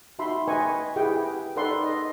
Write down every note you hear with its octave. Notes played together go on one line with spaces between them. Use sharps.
D#4 F#4 E5 B5 C6
B4 D#5 G5 G#5 C#6
E4 G4 G#4 B4 F#5 G5
D#4 A4 B4 D5 F#5 C6
D#5